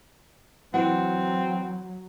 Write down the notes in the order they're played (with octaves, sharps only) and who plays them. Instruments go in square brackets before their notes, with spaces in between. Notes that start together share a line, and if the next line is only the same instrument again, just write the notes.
[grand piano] E3 [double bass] F#3 [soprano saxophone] C4 [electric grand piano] F#5